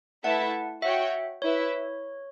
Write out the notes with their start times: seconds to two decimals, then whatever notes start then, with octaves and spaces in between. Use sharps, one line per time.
0.23 A3 E4 B4 E5 F#5 A5
0.82 F#4 C#5 E5 G5
1.42 E4 B4 C#5 E5